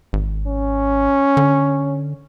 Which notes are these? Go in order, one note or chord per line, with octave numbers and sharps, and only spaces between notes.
G#1
C#4
D3